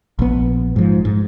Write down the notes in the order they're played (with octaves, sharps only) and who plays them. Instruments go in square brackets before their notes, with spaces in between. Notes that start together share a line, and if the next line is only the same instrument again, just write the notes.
[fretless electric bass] A#1 B3
G#2 F3
G#2